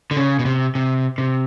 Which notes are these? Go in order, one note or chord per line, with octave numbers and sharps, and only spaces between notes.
D3
C#3
B2
C3
C3
C3